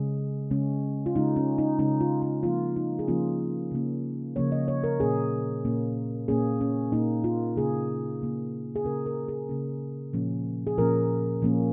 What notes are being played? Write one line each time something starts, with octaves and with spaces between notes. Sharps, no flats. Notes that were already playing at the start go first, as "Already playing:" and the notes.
Already playing: C#3 G#3 C#4 G#4
C#3 G#3 C#4
F4
C#3 G#3 C#4 D#4
C#4
D#4
C#3 G#3 C#4 D#4
F4
D#4
C#3 F3 A#3 C#4 F4
D#4
G#4
C#3 F3 A#3 C#4 F4
C#3 F3 A#3 C#4
C#3 F3 A#3 C#4 C#5
D#5
C#5
A#4
A#2 A#3 C#4 G#4
A#2 A#3 C#4
A#2 A#3 C#4 G#4
C#4
A#2 A#3 C#4 D#4
F4
C#3 A#3 C#4 G#4
C#3 A#3 C#4
G#4
C#3 A#3 C#4 A#4
A#4
G#4
C#3 A#3 C#4
A#2 F3 A#3 C#4
G#4
A#2 F3 A#3 C#4 A#4
A#2 F3 A#3 C#4